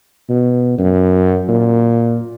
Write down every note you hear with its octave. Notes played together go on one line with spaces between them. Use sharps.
B2
F#2
A#2